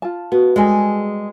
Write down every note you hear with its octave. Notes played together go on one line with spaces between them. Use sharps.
F4 A5
B3 F#4
G3 G#3 G#4 A4 G#5